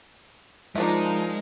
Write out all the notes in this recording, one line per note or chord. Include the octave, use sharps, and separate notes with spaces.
F3 G#3 D4 D#4 F4 A#4 E5